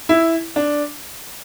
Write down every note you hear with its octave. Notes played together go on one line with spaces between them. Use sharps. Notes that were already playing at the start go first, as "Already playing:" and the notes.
E4
D4